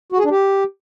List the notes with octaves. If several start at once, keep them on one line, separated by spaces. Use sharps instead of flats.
F#4
G#4
D4
G4